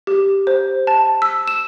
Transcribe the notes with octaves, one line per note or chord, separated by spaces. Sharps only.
G4
C5
A5
E6
E7